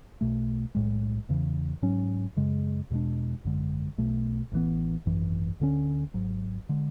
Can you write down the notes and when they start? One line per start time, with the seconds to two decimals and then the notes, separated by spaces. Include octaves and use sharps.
0.21 B1 B2 A3
0.75 B1 A2 G#3
1.29 E2 C#3 E3
1.82 G#2 F#3 C#4
2.36 F#2 C#3 G#3
2.90 E2 B2 G#3 D4
3.44 G#1 F#2 D3 G#3
3.98 B1 B2 A3
4.52 A1 A2 E3 B3
5.06 G#1 F#2 E3
5.60 D2 D3 A3 C#4
6.14 G#1 G#2 F#3
6.69 D3 G#3